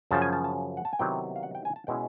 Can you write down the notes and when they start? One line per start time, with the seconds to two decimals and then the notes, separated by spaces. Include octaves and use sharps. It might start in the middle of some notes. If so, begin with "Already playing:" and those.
0.11 F#2 C#3 F3 A5
0.22 G#5
0.33 A5
0.44 A5
0.77 F#5
0.85 A5
0.93 G#5
0.99 C3 D#3 F#3 B3 E4 G5
1.36 F5
1.43 F#5
1.55 G5
1.65 G#5
1.76 A5
1.87 B2 G#3 C#4 E4 G5